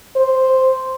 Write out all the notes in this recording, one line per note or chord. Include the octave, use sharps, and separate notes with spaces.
C5